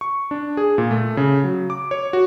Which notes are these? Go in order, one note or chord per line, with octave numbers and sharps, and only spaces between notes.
C#6
D4
G#4
A#2
A3
C#3
F#3
D6
C#5
F#4